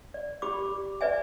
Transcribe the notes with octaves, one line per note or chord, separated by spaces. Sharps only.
D5
G4 B5 D6
B4 D5 E5 G#5